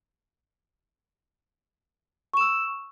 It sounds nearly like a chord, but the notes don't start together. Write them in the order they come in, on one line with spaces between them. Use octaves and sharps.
C#6 E7 E6